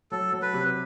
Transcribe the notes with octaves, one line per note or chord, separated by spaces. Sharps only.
F#3 A4
F#3
B4
C3